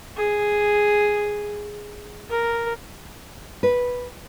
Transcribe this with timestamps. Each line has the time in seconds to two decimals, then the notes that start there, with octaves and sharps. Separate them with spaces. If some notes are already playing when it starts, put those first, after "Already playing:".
0.17 G#4
2.30 A#4
3.63 B4